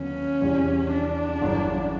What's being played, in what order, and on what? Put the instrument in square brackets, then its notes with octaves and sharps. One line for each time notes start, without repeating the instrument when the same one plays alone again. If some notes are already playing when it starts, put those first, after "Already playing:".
Already playing: [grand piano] D#2 D3 F#3 B3 [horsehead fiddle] C#4
[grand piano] E2 C3 E3 G3
[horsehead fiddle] D4
[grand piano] G1 F#2 C#3 E3